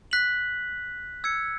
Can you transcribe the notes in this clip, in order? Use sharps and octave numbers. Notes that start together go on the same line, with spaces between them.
F#6 B6 F#7
E6 G#6 C#7